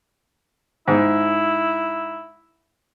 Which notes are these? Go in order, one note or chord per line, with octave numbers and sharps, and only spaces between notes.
G#2 E4